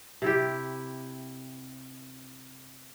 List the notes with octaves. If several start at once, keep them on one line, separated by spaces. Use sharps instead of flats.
C3 E4 G4